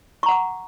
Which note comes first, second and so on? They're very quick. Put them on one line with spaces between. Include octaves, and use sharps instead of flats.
C#6 A#5 F#5 D6